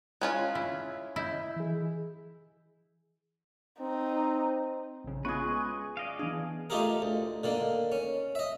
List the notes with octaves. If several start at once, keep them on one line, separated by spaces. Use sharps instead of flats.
G#3 C#4 F4 F#6
E4
E4 D#5 G6
E3 G#4
C4 D#4
A#1 C#3
G#3 B3 C#4 F4 G#4 B4 C#6
D5 D#5 F5
E3 B3 D4 G#4
A3 D#4 F4 G4 G#4 A#4
D2
D3 D#3 A#3
C#4
D#5 E5